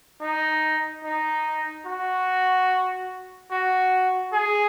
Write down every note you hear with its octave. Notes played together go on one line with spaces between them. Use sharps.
D#4
D#4
F#4
F#4
G#4